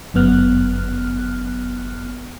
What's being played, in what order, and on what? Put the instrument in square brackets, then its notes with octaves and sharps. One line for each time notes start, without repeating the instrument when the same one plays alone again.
[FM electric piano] G1 F#2 B3 F6 F#6